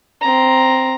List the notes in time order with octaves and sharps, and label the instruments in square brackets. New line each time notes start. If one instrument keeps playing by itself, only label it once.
[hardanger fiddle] C4 A#5